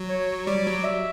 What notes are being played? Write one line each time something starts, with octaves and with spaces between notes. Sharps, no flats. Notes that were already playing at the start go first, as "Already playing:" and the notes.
Already playing: F#3
C#5
G3 D5
F#3
E5